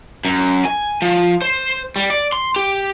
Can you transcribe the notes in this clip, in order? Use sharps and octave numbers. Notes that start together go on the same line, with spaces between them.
F#2
G#5
F3
C5
G3
D5
C6
G4